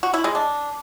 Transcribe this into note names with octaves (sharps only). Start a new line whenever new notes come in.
F#4
E4
G#3
D4